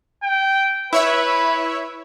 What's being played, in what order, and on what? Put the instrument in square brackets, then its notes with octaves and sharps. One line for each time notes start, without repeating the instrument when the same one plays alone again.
[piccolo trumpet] G5
[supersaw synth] E4 C#5 E5 [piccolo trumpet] B4